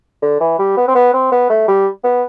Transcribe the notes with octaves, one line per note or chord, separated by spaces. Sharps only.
D3
E3
G3
B3
C4
B3
C4
B3
A3
G3
B3